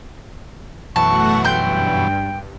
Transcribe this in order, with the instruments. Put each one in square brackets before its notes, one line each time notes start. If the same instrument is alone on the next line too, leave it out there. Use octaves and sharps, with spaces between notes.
[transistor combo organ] F#2 B2 E3 [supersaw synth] A3 F#4 F#5 [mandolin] A5 [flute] C#6
[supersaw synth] G2 [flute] G5 [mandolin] C6 G6